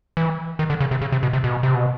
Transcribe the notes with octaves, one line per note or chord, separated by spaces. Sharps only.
E3
D#3
D3
C#3
C3
C#3
C3
B2
C3
B2
C3
B2